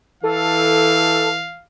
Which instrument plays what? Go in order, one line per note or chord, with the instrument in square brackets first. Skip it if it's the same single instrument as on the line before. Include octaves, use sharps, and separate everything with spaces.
[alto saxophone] E3 [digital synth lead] A4 [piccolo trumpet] F5